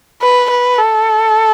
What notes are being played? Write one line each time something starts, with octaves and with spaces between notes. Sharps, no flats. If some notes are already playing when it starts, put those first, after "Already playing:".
B4
B4
A4